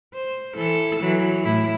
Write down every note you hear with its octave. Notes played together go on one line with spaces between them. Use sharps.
C5
E3 A4
E3 F#3
A2 E4